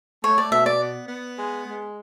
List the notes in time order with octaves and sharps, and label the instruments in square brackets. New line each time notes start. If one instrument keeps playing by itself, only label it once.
[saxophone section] A3 [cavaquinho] C#5
[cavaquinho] D5
[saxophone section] B2 [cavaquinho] E5
[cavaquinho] D5
[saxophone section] B3
B3
G#3
G#3